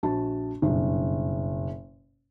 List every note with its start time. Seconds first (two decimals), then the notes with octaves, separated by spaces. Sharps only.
0.03 A#1 F#4 A5
0.62 F#1 G2 B2